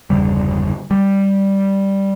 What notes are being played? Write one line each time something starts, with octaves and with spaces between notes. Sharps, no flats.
G1 E2 C#3 G3
G3